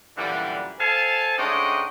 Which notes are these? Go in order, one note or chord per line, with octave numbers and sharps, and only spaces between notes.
F#2 A#2 D3 E3 G3
A4 C5 F5 G#5 A5
G#2 A3 C#4 D4 D#5 G5